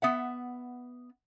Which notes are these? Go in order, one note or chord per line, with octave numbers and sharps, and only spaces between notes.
B3 E5 F#5